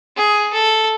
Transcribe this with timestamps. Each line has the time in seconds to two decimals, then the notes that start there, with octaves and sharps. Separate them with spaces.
0.17 G#4
0.53 A4